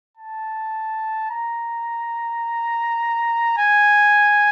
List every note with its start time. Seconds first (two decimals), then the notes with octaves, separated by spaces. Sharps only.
0.17 A5
1.31 A#5
3.58 G#5